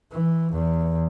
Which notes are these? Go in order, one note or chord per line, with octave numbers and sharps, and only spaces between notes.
E3
E2